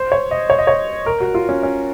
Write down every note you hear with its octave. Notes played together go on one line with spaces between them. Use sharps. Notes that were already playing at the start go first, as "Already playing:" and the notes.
Already playing: C5
C#5
D#5
C#5
D#5
C#5
A#4
F#4
F4
C#4
C#4